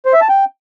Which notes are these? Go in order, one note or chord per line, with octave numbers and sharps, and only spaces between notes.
C5
E5
A5
G5